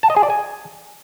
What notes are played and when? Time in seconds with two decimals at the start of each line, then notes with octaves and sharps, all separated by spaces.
0.03 A5
0.10 D#5
0.16 G#4
0.23 D5
0.30 G#5